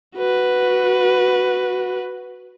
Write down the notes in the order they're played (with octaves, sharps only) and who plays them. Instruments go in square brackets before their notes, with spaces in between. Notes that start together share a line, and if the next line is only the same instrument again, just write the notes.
[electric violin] F#4 B4